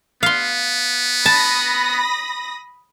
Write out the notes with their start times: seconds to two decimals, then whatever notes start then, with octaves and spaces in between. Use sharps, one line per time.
0.23 B3 F5 C6
1.26 A5 B5 D#6 A#6